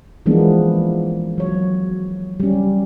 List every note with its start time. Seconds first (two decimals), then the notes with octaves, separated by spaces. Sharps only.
0.26 E3 F3 G#3 A#3 B3 D4
1.38 F#3 C#5
2.40 G3 C#4